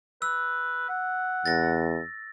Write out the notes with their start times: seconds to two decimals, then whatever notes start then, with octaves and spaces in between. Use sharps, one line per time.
0.22 B4 E6
0.89 F#5
1.46 E2 A6 A#6